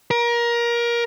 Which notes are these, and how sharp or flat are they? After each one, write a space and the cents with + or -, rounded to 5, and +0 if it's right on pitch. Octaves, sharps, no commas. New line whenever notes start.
A#4 +25